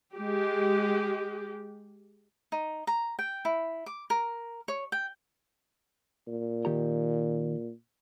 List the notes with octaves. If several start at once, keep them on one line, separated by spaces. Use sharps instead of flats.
G#3 G4
D#4
A#5
G5
E4
D6
A#4
C#5
G5
A#2
D#3 G4 A#5